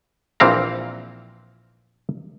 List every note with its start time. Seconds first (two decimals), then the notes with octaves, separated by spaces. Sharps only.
0.40 A#1 E3 C4 F5 A#5